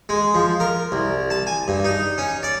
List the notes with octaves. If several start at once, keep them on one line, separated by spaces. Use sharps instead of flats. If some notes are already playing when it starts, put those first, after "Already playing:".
G#3
F3
A#4
C2
A5
G#5
G2
D#4
C#4
D5